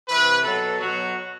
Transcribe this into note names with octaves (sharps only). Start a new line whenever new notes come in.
C3 E3 B4
B2 F#3 A4
B2 F#3 F#4